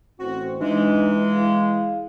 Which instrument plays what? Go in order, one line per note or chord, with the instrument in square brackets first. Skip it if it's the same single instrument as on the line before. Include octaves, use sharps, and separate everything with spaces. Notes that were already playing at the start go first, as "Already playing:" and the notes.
[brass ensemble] A1 C4 [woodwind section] F#4
[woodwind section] E3 G#3 [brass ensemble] D4 D#4
[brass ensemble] E4 G#4 F5